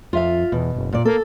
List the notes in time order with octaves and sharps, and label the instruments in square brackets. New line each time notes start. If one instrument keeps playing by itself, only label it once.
[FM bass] F2 [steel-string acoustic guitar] F4 E5 F5
[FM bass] E2 [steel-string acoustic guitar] B2
[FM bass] F#1
[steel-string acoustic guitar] A#2 D5
[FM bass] A#3 [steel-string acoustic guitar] A4